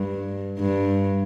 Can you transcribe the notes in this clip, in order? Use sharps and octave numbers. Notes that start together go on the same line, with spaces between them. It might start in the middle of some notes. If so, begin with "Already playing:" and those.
Already playing: G2
G2